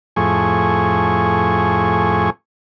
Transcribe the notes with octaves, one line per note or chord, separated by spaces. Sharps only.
F2 A2 G#4 C#6